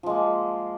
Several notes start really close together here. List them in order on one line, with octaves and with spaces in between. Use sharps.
F3 G#3 A#3